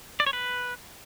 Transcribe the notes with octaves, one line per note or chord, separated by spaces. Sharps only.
D5
C#5
B4